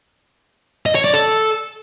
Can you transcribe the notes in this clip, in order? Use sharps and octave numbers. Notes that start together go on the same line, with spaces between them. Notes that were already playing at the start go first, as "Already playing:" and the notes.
D#5
C#5
D5
A4